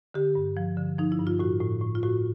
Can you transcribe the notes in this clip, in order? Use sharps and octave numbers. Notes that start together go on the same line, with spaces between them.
D3 G4
G2
F3
D3
F3 D#4
E4
G2
F4
A2 F#4
A2
A2
F4
A2 F#4